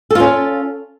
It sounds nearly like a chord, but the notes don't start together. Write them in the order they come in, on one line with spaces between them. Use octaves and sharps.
A4 F4 C#4